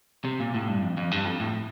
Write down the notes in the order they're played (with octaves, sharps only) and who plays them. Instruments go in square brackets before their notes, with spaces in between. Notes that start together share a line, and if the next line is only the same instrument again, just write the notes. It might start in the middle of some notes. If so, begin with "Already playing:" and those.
[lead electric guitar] C3
A#2
A2
G2
F2
F2
G2
F2
A2